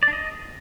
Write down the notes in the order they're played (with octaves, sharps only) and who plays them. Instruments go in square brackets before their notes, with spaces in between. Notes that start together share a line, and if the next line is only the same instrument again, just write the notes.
[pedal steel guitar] D5
D4
D#5